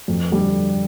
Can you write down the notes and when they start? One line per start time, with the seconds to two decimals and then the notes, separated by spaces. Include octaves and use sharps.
0.08 F2
0.32 D3 G3